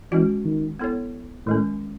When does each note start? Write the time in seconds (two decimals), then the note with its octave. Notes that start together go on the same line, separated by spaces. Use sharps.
0.12 E3 G#3 C#4 F#4
0.45 D#3
0.79 B3 E4 A4 C#5
1.47 A2 D#3 G#3 C#4